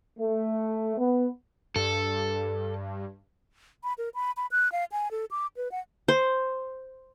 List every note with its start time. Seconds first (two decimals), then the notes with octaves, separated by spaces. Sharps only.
0.19 A3
0.98 B3
1.76 G2 A4
3.84 B5
3.98 A#4
4.15 B5
4.37 B5
4.52 F#6
4.72 F5
4.92 G#5
5.11 A4
5.31 D6
5.57 B4
5.72 F#5
6.08 C5